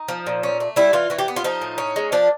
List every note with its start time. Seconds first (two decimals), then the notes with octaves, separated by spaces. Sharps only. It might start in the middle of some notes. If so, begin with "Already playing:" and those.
Already playing: D#4
0.08 F3
0.27 A#2
0.43 C#4
0.60 A3
0.76 G3 E4
0.93 E3 F4
1.10 E3 F#4
1.19 G4
1.28 B3
1.36 F4
1.44 F3 D#4
1.61 A2
1.78 C#4
1.96 G#3
2.12 F3 D4